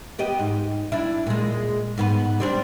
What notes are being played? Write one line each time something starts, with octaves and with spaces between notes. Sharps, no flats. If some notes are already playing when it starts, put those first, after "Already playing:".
B3 G4 D#5
G#2
D4 E4
A#2 G#3
G#2 B3 B4
G3 C4 D4